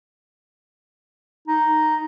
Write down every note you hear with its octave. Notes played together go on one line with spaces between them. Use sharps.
D#4